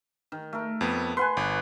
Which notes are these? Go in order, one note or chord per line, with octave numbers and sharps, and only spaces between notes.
D#3
A3 A#4
F2 B3
B4 F#5 G#5 C6
G1